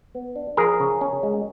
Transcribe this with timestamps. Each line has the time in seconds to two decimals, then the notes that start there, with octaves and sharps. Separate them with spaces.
0.15 B3
0.36 D4
0.57 F3 G#4 A#4
0.80 C#3
1.01 C#4
1.23 G#3